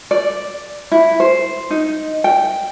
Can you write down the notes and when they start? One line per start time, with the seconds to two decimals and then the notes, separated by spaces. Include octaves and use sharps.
0.11 D5
0.92 E4
1.20 C5
1.70 D#4
2.24 G5